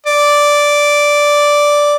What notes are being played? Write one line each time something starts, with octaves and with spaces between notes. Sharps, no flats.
D5